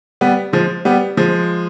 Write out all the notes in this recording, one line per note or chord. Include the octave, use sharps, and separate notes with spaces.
G3 B3
F3 G#3
G3 B3
F3 G#3